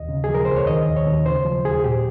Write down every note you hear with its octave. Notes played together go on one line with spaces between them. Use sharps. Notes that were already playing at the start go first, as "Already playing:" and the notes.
Already playing: D#2 D#5
C#3
F3 G#4
A#4
C#2 C5
C#5
D#3 D#5
D#2
C#5
D#2
C#3 C5
F3
D#2 G#4
A#2 G4